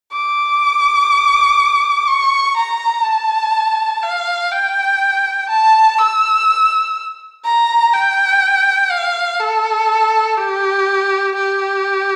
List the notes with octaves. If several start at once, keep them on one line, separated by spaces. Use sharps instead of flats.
D6
C#6
A#5
A5
F5
G5
A5
E6
A#5
G5
F5
A4
G4
G4